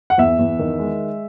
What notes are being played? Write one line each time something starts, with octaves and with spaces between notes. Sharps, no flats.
F#5
E2 E5
E2
D#3
G#3